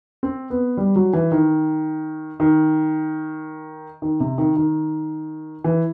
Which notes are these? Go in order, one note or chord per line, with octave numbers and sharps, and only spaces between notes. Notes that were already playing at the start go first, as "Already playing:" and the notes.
C4
B3
G3
F#3
E3
D#3
D#3
D#3
C3
D#3
D#3
E3